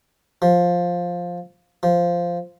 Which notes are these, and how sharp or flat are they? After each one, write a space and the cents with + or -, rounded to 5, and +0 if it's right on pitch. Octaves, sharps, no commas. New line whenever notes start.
F3 +10
F3 -5